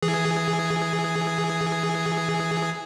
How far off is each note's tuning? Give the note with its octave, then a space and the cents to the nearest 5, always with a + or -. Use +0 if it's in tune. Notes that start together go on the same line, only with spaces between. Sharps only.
E3 +0 G#4 +0